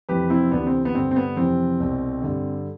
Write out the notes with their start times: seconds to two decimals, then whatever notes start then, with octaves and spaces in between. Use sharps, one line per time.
0.09 F2 C3 E3 G4 B4
0.30 C4 E4
0.52 D2 C3 E3 B3 D4
0.66 C4
0.85 B3
0.94 G2 D3 C4
1.11 C4
1.16 B3
1.37 F2 C3 E3 C4
1.80 C2 B2
2.22 G2 D3